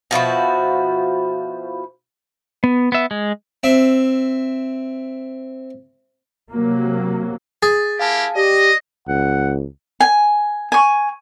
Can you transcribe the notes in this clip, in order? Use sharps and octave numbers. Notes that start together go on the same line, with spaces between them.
B2 F3 E4 F#4
B3
B3 E5
G#3
C4 E5
C3 F#3 A#3
G#4 A6
A#3 E4 G4 F5 G#5 A5
G4 D5 D#5
C#2 F#5
G#5
G#5 C#6